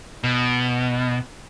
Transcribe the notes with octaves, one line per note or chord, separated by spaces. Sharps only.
B2